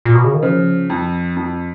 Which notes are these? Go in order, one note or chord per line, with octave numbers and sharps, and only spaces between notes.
A#2
B2
C#3
D#3
C#3 F3
F2
F2